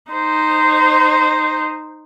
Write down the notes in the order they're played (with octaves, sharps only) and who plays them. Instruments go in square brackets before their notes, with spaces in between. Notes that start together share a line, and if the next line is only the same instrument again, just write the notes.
[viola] D#4 C5